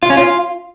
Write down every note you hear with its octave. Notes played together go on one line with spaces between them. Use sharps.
F4
C#4
F4